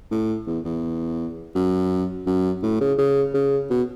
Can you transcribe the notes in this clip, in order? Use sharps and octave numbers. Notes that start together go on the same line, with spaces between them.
A2
E2
E2
F#2
F#2
A2
C#3
C#3
C#3
B2